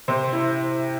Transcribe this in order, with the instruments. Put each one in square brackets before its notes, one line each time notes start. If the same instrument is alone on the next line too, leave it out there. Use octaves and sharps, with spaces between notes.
[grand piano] C3 [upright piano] C5
[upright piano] E4